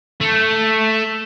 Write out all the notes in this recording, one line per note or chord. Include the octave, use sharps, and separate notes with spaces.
A3